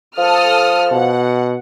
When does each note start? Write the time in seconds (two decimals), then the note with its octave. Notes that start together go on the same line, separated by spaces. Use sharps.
0.18 F3 A4 D#6 F6
0.92 B2 F#5